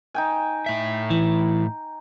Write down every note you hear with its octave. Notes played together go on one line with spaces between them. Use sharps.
D#4 G5 G#5
A2 E5
E3